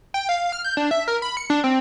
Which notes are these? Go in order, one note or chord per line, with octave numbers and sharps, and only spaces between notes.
G5
F5
F6
G6
D4
E5
A#4
B5
C#7
D4
C4